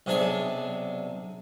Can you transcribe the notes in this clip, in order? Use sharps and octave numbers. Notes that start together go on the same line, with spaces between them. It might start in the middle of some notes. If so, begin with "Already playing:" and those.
B1 C3 D4 G#4 G#5